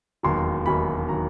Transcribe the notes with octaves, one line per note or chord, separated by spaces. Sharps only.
E1 D#2 D#3 F#3 C6
E1 D#2 D#3 F#3 B5
D#3 F#3 A#5